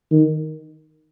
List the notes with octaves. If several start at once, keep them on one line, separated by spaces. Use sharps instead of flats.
D#3